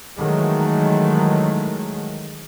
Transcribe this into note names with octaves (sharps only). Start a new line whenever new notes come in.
D#3 E3 F#3 G#3 A3